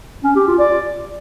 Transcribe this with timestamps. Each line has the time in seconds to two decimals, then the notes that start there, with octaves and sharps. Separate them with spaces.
0.24 C#4
0.36 G4
0.47 F4
0.59 D5